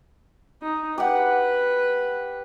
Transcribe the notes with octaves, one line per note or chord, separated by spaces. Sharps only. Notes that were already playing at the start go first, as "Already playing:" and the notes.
D#4
G4 B4 F#5